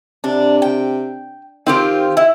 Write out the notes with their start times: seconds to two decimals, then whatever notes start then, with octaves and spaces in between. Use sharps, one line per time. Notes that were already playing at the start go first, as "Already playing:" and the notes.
0.24 C3 D4
0.62 G5
1.67 D#3 C4 F4 G4
2.17 E4